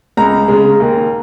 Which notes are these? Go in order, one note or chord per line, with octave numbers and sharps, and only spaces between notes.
C#2 A#5
C#3 G#3
D#2